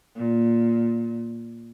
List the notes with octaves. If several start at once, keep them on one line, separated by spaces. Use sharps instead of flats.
A#2